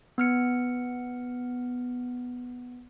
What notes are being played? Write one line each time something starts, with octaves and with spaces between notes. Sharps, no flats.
B3 F6 C#7